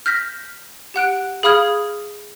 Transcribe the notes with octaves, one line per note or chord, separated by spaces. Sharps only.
F6 G6 A#6 B6
G4 F#5 F#6 D7
G#4 F5 B5 D#6 F6 G#6